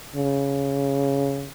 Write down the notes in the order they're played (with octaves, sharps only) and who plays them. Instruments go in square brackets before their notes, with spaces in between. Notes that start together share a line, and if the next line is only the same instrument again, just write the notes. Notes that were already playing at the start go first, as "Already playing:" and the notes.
[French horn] C#3